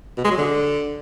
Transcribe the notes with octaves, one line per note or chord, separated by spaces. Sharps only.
B2
G#3
F#3
D3